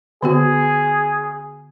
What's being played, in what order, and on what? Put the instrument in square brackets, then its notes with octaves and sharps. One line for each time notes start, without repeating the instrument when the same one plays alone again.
[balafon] D3 B3 F#4 [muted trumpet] G#4